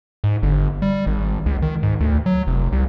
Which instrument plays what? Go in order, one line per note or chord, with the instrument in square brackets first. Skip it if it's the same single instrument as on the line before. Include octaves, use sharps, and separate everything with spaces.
[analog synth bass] G#2
G1
G3
G#1
C#2
D#3
G#2
D2
F#3
F1
C2